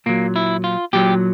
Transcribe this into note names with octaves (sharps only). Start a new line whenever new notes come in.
A#2 F#3 A#3
E4
F4
A#2 F#3 G4